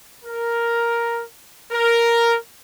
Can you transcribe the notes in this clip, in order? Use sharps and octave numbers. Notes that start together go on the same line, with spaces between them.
A#4
A#4